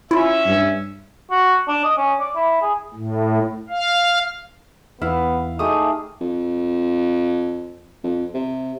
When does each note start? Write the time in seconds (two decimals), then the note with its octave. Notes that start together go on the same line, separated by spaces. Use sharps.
0.11 C#4 E4 F4 E5
0.46 G2
1.31 F#4
1.68 D4
1.84 D#5
1.97 C#4
2.20 D5
2.35 E4
2.62 G#4
2.94 A2
3.69 F5
5.01 E2 B3 E4 F5
5.59 A3 D#4 G4 G#4 D#6
6.21 F2
8.04 F2
8.34 C3